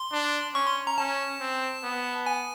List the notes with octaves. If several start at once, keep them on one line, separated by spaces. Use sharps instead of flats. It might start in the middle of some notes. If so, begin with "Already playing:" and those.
Already playing: C6
D4
C#4 C#6
C6
A#5
C#4 A5
C4
B3
G#5